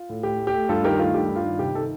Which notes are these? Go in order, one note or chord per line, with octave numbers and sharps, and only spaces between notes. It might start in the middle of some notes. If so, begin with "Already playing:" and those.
Already playing: F4
A2
A2 G4
A3
G4
A3
G2 F4 A4
D#3 G4 A#4
A3 F4
G2 G4
G2
F4
D#3
C3 G4
D#3 A4